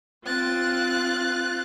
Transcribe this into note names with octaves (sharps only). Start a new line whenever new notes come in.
C4 F4 F#6 A6